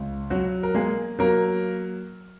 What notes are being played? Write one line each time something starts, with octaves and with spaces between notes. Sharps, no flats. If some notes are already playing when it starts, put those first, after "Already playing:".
Already playing: C#2
F#3 F#4
A#4
G#3 A#3 G#4
F#3 A#3 A#4